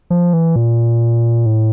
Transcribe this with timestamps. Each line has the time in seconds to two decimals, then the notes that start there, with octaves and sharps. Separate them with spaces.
0.10 F3
0.33 E3
0.56 A#2
1.46 A2